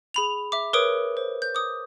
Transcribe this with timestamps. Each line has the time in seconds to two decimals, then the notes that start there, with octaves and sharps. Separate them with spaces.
0.14 G#4 B5 F7
0.52 E5 D6
0.73 A#4 B4 C#5 D6 D#6 D7
1.17 C5
1.42 G6
1.55 D6 D#6